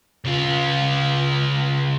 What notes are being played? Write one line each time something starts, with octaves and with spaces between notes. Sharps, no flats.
C#3 F4